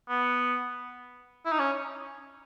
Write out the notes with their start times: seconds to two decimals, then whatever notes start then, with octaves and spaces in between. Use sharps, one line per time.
0.09 B3
1.46 E4
1.52 D#4
1.59 C#4